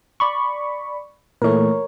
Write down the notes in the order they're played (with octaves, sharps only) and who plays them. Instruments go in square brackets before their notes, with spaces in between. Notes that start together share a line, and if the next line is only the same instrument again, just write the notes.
[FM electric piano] D5 B5 C#6
[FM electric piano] A#2 E3 A3 [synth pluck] A#4 C#5